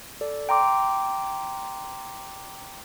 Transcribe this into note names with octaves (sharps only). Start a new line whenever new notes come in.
A4 D5
G5 A#5 C6 D6